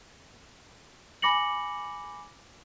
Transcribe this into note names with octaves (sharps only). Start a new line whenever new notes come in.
G#5 B5 D6 A#6 C#7 F#7